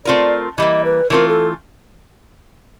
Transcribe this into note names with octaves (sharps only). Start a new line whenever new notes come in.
A3 C4 F4 A#4 D5
E3 G3 A#3 D#5
B4
E3 A3 C4 F4 A#4
A4